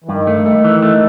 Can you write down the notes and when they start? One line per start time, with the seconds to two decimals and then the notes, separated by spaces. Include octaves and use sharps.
0.04 E3
0.09 G2 D#3
0.27 A3
0.46 A3
0.64 E3
0.83 A3